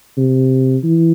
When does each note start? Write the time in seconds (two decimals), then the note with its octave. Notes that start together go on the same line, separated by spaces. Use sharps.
0.17 C3
0.84 E3